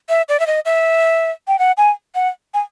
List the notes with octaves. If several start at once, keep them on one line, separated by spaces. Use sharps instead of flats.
E5
D5
E5
D#5
E5
G5
F#5
G#5
F#5
G#5